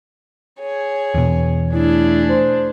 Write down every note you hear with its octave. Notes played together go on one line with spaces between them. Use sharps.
G#4 C#5
E2 B2
A3 D4 E4 G#4
C5